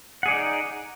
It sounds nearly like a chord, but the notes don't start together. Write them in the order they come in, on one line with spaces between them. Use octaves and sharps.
F#5 G#4 D5 D#4